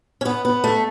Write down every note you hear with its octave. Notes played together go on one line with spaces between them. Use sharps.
C#4
B3
B3
A3